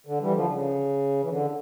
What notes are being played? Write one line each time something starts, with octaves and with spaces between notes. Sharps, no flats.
D3
E3 G3
D3 F3
C#3
E3
D3